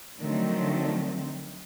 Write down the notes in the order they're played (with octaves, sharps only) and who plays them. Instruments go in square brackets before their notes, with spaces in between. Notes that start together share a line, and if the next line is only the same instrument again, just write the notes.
[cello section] D3 D#3 F3 F#3 A3 C4